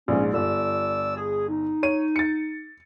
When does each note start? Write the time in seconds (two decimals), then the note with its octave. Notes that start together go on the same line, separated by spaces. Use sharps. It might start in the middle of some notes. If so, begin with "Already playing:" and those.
0.08 A#1 G#2 C#4
0.34 G1 D5 E6
1.16 G#4
1.49 D#4
1.83 C#5 D#7
2.16 A6 C#7